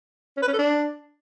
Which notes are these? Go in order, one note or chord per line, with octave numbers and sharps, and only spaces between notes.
C#4
B4
C#4
A4
D4